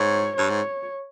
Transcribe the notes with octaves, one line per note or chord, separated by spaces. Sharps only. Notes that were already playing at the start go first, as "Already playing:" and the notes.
Already playing: G#2 C#5
G2 C#5
G#2